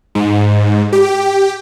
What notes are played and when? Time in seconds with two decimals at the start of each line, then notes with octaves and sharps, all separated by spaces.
0.15 G#2
0.93 G4